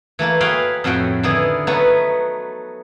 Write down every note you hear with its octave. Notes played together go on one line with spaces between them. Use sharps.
E3 A3 A#3 E4
F#4 G#4 B4 C#5 F5 G5
F2 A2 F#4 F#5 G5
D3 D#3 B3 E4 G#4
F#3 A3 B3 D#4 F#4 B4